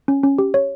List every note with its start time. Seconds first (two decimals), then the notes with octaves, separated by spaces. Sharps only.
0.08 C#4
0.24 C#4
0.38 G4
0.54 C#5